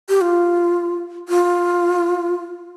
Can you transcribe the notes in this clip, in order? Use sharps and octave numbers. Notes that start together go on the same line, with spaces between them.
G4
F4
F4